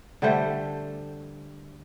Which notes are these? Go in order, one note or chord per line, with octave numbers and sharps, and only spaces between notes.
D3 G3 A3 C5